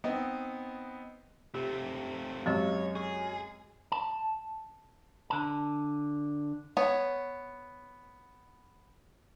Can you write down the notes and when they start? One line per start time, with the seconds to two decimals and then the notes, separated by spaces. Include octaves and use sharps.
0.04 B3 C4 D#4
1.54 C3 A3 G4
2.46 F#2 G#3 C4 G4 C#5 D#5
2.95 G#4 C#6
3.92 A5
5.30 D3 A5
6.77 B3 C#5